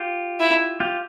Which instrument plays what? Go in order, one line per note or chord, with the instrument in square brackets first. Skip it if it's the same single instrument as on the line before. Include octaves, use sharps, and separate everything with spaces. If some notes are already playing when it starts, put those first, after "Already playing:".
Already playing: [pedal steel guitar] F4 G4
[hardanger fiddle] E4
[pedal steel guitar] F4 G4